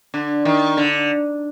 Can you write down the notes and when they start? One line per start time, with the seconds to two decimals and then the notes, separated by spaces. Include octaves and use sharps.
0.14 D3
0.45 D#3
0.77 D3